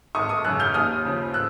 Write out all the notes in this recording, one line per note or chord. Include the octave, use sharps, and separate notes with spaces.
G#1 C#6 D#6
C#6 D#6
F#2 C#3 E6 F#6
F6 G6
D#2 D#6 F6
C#3 F3
E6 F#6